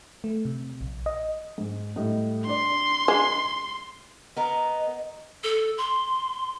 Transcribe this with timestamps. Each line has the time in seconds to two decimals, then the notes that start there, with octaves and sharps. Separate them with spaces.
0.24 A3
0.45 C3
0.81 A#1
1.06 D#5
1.58 G#2
1.96 A2 G3 D#5
2.46 D4 D5 C6
3.08 G#3
4.37 B3 A#4 D#5
5.44 A4
5.78 C6